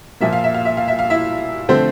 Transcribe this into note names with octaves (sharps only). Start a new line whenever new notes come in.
A#2 F3 A#3 E5
F5
E5
F5
E5
F5
E5
F5
E4 E5
D3 F3 A3 C4 C5